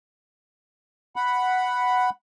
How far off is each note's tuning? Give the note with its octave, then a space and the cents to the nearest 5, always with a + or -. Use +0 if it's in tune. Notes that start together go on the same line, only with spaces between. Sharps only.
F#5 +0 B5 +0